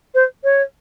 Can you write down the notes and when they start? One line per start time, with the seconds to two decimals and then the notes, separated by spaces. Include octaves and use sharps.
0.14 C5
0.44 C#5